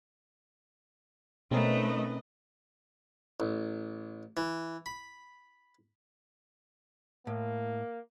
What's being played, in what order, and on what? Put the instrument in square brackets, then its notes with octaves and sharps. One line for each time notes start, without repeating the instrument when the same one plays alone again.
[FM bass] B2 [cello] A3 [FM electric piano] C4 C#4 A#4 [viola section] D#4 B4 D#5
[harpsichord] A1
E3
B5
[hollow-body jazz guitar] A2 [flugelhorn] A#3